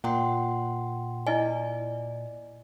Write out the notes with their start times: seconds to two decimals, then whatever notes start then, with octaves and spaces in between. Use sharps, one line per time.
0.04 A#2 F#5 G5 C6
1.27 E4 D5 D#5 G#5